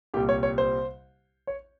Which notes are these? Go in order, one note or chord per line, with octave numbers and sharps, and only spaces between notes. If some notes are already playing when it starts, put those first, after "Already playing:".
C2 A#2 G3 G4
C#5
C#5
C5
C#5